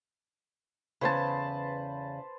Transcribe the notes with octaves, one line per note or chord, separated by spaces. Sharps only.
E2 C#3 B4 C5 A5